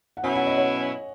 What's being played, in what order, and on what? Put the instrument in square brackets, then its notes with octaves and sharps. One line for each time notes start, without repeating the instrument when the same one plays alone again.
[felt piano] F#5
[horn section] B2 F#3 C#4 E4 [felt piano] G#5
[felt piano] F#5
D#5
C#5